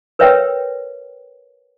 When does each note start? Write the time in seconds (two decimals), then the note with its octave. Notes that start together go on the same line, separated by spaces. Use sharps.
0.19 A#4 B4 C#5 E5 G5